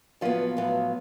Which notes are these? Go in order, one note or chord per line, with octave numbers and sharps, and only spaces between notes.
A2 F3 F#3 B3 F4
A2 F#3 B3